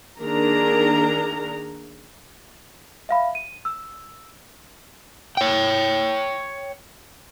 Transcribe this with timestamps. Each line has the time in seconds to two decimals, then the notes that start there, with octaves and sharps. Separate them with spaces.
0.21 D#3 A#3 D4 G#4 A#4 A#5
3.09 E5 F5 B5
3.35 D#7
3.65 E6
5.37 C#5 G5